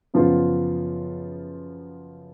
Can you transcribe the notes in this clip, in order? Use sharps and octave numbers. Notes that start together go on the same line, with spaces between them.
F#2 C#3 F3 B3 F4